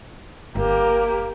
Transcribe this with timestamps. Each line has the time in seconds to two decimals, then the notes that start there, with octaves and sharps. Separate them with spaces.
0.55 G1 A#3 G4